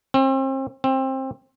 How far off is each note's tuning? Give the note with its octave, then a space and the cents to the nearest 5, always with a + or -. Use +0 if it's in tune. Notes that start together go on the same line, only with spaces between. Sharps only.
C4 +35
C4 +20